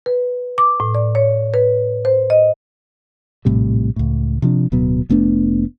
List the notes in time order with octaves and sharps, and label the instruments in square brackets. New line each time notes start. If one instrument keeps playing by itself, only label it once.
[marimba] B4
D6
A2
D5
C#5
B4
C5
D#5
[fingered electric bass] A#1 A2 C3 G3
C#2 A2
C3 F3 D4
D1 B2 F#3 B3
F1 A3 B3 D4